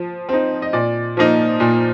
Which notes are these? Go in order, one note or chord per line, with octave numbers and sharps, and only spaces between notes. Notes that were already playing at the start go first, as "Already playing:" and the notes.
Already playing: F3
C4 D#4
D#5
A#2 D5
F3 A#3 D#4
A#2